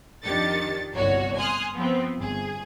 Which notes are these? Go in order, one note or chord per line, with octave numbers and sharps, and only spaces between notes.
F2 D#3 D4 G4 A6 C#7
G1 C2 F#4 C#5
G#5 C6 D#6 F6 F#6
F3 B3 C4
G1 G#4